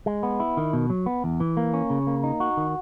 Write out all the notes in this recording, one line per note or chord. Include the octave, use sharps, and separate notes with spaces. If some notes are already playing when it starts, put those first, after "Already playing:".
G#3
B3
E4
D#3
B2
F#3
B3
E2
E3
A#3
C#4
C#3
A#3
D#4
F#4
D#3